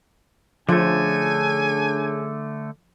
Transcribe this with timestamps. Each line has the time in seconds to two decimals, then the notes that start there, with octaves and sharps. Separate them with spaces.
0.69 D3 F3 A3 C#4 D4 G#4 G#5